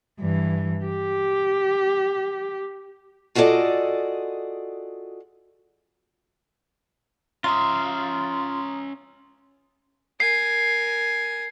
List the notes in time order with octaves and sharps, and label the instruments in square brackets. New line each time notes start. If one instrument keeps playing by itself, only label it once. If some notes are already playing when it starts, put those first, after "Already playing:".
[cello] G2 E3
G4
[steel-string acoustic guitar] F4 F#4 G#4 A4 D5 D#5
[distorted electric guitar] C#4 E5 [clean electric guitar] F4 [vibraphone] A#5 D#6
[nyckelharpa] A#4 G#5 [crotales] C7